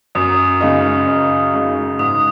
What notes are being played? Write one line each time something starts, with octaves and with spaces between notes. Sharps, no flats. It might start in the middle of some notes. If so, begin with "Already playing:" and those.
F#2 D#6
C#3 G#3 D#4
F#2
C#3 G#3 D#4
G#2 D#6